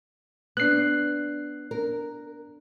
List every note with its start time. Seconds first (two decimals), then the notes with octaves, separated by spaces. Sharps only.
0.57 B3 D4 F#6 C7
1.71 A#4